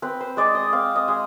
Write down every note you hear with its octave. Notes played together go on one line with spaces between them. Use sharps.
C4 B4
C5
G#3 D5
D#5
C4 F5
D#5
G#3